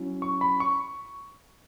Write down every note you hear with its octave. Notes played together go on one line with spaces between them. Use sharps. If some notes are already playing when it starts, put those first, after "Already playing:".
Already playing: F#3 C#4 E4
C#6
B5
C#6